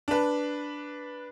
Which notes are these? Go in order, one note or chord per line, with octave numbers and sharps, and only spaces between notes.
D4 B4